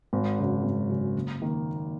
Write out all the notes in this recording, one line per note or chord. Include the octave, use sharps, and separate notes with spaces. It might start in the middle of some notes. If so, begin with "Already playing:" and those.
G#1
F#2 C#3 F#3
G#1
F#2 C#3 F#3
F#1
D#3 A#3